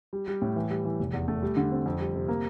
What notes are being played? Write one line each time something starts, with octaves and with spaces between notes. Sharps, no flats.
G3
G3
A2
E3
G3
E3
F1
E2
A3
G3
D3
C4
F2
G3
C3
A#3